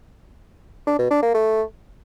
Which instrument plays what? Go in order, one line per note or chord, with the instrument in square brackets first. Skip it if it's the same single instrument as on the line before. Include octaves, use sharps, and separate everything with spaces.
[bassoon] D4
B2
D4
A#3
A3